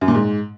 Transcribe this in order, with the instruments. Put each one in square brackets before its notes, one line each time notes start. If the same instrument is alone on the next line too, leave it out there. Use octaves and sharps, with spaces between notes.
[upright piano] F#2
A#2
G#2